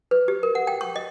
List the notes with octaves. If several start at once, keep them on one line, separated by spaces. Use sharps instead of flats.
B4
G4
A#4
F#5
G5
C#6
D#5